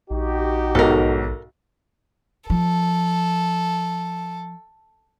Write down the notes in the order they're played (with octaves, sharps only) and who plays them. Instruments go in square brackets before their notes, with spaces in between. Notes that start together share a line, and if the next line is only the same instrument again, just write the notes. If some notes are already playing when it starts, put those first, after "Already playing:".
[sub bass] A#1 [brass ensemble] D#4 F#4 G4
[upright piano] B1 G#2 [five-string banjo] A4 A#4
[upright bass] F3 [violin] A4